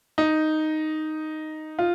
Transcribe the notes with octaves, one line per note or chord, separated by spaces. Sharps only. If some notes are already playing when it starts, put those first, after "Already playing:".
D#4
F4